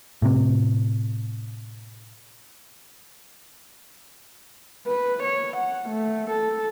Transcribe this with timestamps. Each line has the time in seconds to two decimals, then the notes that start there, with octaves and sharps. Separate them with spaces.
0.22 A2 C3
4.87 B4
5.23 C#5
5.57 F#5
5.89 A3
6.31 A4